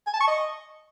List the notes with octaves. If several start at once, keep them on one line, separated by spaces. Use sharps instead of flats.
G#5
A5
C#6
D#5